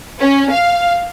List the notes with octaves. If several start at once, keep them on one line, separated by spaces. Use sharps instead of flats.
C#4
F5